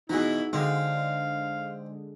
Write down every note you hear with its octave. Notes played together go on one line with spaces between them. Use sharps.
B2 E3 D#4 E4 F#4 G#4
D3 G#3 C4 F5